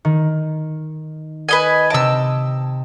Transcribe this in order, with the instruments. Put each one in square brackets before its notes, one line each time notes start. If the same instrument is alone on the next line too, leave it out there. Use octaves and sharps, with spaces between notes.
[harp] D#3
[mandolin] B4 D#5 G#5
[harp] C3 D#5 D7 [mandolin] A5 E6